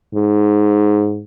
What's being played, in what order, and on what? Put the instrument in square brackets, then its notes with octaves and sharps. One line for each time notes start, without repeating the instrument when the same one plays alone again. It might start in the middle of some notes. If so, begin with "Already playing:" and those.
[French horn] G#2